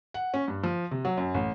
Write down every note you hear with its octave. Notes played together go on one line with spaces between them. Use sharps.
F#5
C#4
G2
F3
C3
F#3
F#2
A1